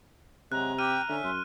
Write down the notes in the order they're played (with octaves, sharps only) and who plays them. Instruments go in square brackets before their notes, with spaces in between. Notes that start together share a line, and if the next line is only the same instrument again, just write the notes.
[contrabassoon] C3 [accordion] F#3 G#3 [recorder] A#5 [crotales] F#6
[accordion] G4 G5 [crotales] F6 D#7
[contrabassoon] D3 [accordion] C#4 E5
[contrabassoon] F#2 [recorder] C6